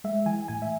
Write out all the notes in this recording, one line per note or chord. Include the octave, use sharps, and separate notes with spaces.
G#3 E5
E3 G#5
A2 G#5
E5